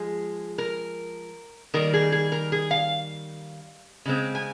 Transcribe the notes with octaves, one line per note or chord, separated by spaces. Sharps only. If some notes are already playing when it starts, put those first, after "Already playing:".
Already playing: F3 G#3 G#4
A#4
D#3 G3 A#3 A#4
G#4
G#4
A#4
G#4
F5
C#3 G#3 C4
G#5